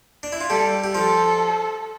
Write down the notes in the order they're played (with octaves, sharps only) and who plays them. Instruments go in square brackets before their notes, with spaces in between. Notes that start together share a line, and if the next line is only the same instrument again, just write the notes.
[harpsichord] D4
E4
F4
[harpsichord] G3 G4 [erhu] A4
[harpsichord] G4
[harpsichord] F3 F4 [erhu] A4